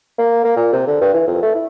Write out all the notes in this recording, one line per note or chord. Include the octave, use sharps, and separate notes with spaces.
A#3
A#3
A#2
C3
D3
G2
E3
F2
A3
E4